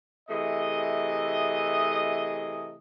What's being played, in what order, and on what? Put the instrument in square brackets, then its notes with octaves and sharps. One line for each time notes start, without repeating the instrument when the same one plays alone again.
[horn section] C3 E3 A3 G#4 D#5